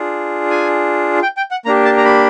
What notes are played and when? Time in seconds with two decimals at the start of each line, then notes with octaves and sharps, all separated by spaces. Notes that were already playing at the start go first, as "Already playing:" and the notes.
Already playing: D4 F4 G#4
0.50 G#5
1.22 G5
1.37 G5
1.51 F#5
1.65 A#3 D4 G4 A#5
1.85 A5
1.97 A#5
2.05 B5